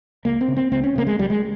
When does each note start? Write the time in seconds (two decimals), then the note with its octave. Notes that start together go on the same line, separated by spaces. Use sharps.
0.25 C#2 A#3
0.41 C4
0.48 C#3
0.57 C4
0.72 C#2 C4
0.84 C#4
0.96 C#3 A#3
1.07 G#3
1.19 C#2 G3
1.30 G#3